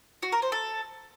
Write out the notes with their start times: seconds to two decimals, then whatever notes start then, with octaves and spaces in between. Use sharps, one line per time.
0.23 F#4
0.32 A#4
0.42 C5
0.52 A4